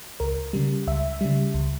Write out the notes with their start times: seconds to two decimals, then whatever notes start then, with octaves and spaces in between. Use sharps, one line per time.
0.20 C#2 A#4
0.53 C#3 G3
0.87 C#2 E5
1.21 C#3 G3
1.54 C#2